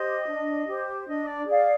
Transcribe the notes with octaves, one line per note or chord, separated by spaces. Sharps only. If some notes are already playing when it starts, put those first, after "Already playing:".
Already playing: G4 C5 D#5
D4
G4 C5
D4 D#5
D5
G#4 D5 F5